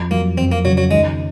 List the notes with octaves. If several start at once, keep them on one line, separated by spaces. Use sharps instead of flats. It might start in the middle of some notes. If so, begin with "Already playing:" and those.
Already playing: F2
F#3 A#3
F2 C4
A#3
C#3 F#3
F#3
D#3 G#3